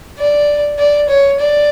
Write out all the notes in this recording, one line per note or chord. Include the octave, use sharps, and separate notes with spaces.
D5
D5
C#5
D5